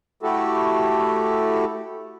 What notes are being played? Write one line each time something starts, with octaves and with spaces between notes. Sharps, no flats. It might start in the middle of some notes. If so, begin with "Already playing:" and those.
A3 E4 F#4 G4 A4